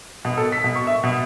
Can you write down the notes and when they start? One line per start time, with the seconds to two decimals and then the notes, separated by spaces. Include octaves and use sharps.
0.25 B2
0.37 A4
0.52 B6
0.64 B2
0.76 C#6
0.87 E5
1.04 B2